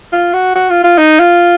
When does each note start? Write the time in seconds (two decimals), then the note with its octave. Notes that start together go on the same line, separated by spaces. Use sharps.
0.13 F4
0.34 F#4
0.55 F#4
0.69 F4
0.84 F4
0.98 D#4
1.20 F4